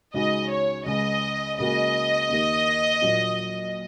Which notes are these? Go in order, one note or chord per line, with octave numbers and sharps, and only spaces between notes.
C#2 C#3 G#3 D#4 F#4 D#5
C#5
C#2 C#3 G#3 D#5
C#2 C#3 A#3 F#4 D#5
D#2 D#3 A#3
A#1 A#2 F#3